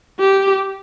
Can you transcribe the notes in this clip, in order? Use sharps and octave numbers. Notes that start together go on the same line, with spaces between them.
G4